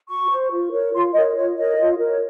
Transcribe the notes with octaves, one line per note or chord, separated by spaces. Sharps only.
F#4 C#6
C5
F4
A#4 C#5
F4 C6
A#4 C#5 D#5
F4 C#5
A#4 C#5 D#5
F4
A#4 C#5